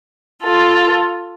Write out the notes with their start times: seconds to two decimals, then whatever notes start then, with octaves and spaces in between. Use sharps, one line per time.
0.43 F4 A4